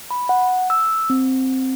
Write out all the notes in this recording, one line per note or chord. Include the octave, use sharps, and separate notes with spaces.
B5
F#5
E6
C4